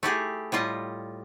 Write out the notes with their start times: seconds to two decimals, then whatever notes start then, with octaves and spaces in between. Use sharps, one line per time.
0.03 A3 E4 G4 G#4
0.52 A2 G3 F4 D#5